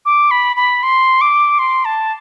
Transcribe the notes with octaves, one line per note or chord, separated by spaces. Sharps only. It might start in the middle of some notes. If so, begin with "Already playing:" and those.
D6
B5
B5
C6
D6
C6
A5